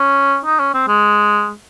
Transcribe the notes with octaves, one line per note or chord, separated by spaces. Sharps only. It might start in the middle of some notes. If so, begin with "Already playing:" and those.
Already playing: C#4
D#4
C#4
C4
G#3